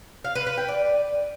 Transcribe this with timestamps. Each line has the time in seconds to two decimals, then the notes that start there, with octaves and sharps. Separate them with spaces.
0.24 F5
0.35 B4
0.46 B4
0.57 G5
0.68 D5